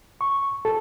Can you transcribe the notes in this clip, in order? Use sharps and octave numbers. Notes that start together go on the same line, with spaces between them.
C#6
A4